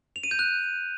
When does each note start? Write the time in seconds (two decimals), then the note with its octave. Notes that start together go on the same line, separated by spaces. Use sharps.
0.16 F7
0.24 D#7
0.31 G6
0.39 F#6